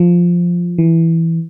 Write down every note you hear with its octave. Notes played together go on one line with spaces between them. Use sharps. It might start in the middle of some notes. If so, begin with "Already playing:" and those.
Already playing: F3
E3